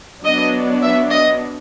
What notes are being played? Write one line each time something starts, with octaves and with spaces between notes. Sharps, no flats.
F#3 B3 D4 D#5
E5
D#5